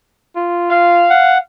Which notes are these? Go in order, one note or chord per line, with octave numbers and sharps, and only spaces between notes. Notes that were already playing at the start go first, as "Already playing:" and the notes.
F4
F5
F#5